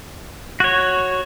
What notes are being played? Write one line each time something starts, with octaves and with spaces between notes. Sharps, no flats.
F#4 C#5